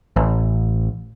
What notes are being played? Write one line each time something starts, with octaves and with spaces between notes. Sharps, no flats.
A1